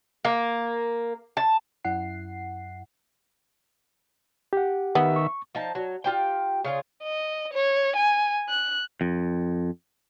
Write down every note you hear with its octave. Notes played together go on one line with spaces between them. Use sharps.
A#3
A5
F#2 E4 F#5 C7
G4 F#5
D#3 B3 E5
C#6
F3 D#4 A5
F#3
F4 G4 G5
C#3 F4 G#4
D#5
C#5
G#5
F#6
F2